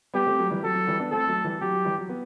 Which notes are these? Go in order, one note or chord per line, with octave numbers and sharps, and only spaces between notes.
G3 B3 G4
A3 C4
F#3 A3
E3 G3
F#3 A4
F#3
E3 G3
B3 D4
A3 C4 A4
F#3 A3
E3 G3
F#3 G4
F#3
E3 G3
F#3
B3